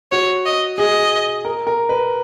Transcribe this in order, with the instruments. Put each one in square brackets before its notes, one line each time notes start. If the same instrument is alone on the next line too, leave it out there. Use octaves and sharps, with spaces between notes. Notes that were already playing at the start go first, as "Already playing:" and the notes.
[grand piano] F#4 [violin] C#5
[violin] D#5
[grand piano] G#4 [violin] D#5
[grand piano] A#4
A#4
B4